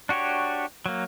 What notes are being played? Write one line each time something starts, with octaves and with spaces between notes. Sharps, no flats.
D4 F#4 G4 C#5
F#3 A#3